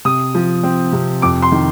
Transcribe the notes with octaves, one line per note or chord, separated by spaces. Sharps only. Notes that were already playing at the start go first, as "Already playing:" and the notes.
C3 D#6
F3
C4
C3
F2 D6
C6
D#3